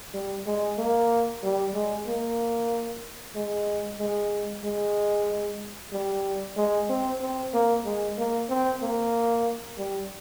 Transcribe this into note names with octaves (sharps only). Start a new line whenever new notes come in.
G3
G#3
A#3
G3
G#3
A#3
G#3
G#3
G#3
G3
G#3
C4
C4
A#3
G#3
A#3
C4
A#3
G3